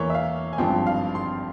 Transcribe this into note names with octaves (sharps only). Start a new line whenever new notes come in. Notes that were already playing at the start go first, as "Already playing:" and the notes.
Already playing: E2 E3 A#3 C#5
E5
F5
G#5
G#1 G2 F3 C4 G5
F5
C6